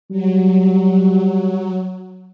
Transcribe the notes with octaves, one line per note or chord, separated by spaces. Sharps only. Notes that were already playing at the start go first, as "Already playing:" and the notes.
F#3 G3